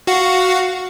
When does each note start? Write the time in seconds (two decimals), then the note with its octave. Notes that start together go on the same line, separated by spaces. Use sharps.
0.07 F#4 F5 F#5